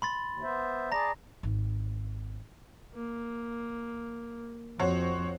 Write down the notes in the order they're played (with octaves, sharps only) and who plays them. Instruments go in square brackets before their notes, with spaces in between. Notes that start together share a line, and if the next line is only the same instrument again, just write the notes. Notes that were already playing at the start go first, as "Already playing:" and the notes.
[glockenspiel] B5 C6 A6
[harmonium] D#2
B3 C5 E5
[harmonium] G#4 D5 A5 [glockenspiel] A#5 A#6
[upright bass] G#1
[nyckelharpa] A#3
[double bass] F2 [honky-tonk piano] F#4 C5 C#5